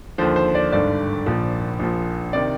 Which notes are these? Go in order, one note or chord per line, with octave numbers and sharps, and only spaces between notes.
D#2 D3 F3 C5
C5
D5
G#1 G2 D3 D5
A#1 A#2 F3
A#1 A#2 F3
C3 D#3 D5